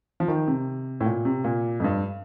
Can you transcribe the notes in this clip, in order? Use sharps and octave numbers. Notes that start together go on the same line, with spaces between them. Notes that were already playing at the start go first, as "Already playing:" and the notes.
F3
D#3
C3
A2
A#2
C3
A#2
F2
G2